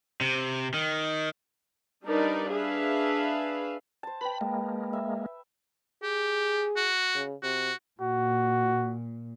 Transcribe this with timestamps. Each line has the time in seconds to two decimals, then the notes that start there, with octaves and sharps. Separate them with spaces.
0.21 C3
0.74 D#3
2.05 G3 D4 D#4 A#4 B4 D5
2.51 D4 G#4 B4 E5 F5
4.03 C5 A5
4.21 B4 G5 B5
4.41 G#3 A#3
4.93 E5
6.03 G4 G#4
6.76 F#4
7.15 C#3
7.43 C3 F#4
8.01 A#2 F#4